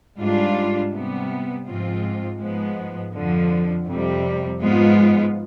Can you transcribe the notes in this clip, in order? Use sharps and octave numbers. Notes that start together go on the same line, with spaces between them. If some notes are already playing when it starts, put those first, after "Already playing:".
G#2 G3 D4 F4
C3 G3 B3
G#2 F3 G#3 C4 F4
G#2 F3 G#3 B3
F2 D3 F3
F2 C3 G3
G#2 F3 G#3 B3 F4